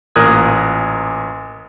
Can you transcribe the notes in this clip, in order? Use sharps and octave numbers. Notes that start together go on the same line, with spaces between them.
A1 A#2 A#4 D#6 F#6 G#6